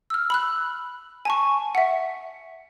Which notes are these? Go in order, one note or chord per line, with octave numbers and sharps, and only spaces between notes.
E6 F6
B5 E6 F#6
G#5 A5 C#6
E5 F#5